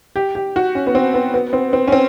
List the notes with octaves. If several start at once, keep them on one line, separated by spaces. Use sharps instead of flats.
G4
G4
F#4
C#4
B3
C4
B3
B3
C4
C4
C#4
C4